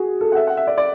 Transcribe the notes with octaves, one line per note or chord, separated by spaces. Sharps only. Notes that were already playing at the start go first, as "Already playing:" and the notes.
Already playing: F#4 G#4
A4
F#5
E5
F#5
E5
D5
D5